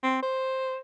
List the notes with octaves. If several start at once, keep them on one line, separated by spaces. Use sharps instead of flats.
C4
C5